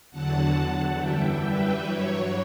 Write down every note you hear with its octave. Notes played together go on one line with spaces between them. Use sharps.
E2 D3 F#3 F#5 A5
F#2 E3 G3 E5 G5
B4
G2 F#3 C#5